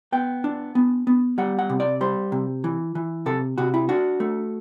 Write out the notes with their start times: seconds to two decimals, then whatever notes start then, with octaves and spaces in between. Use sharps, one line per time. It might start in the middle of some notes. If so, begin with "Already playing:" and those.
0.12 B3 G5
0.44 D4
0.75 B3
1.07 B3
1.38 G3 F#5
1.59 F#5
1.70 C3
1.80 D5
2.01 G3 C5
2.32 C3
2.64 E3
2.95 E3
3.26 C3 A4
3.58 C3 F#4
3.74 E4
3.89 D4 F#4
4.20 A3